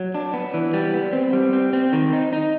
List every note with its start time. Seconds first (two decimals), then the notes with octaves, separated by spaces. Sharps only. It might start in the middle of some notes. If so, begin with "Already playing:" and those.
Already playing: F#3
0.15 D4
0.33 B3
0.54 E3
0.74 G3
0.94 B3
1.13 C4
1.33 G3
1.53 C4
1.73 C4
1.93 D#3
2.13 D#4
2.33 D#4